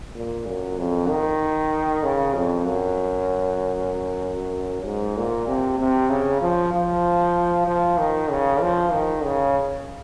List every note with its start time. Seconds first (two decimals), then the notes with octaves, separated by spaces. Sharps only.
0.15 A#2
0.47 F#2
0.78 F2
1.09 D#3
2.03 C#3
2.34 F2
2.66 F#2
4.85 G#2
5.17 A#2
5.48 C3
5.79 C3
6.10 C#3
6.42 F3
6.73 F3
7.67 F3
7.99 D#3
8.30 C#3
8.61 F3
8.93 D#3
9.24 C#3